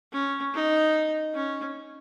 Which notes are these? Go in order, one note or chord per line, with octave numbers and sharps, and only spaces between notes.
C#4
D#4
C#4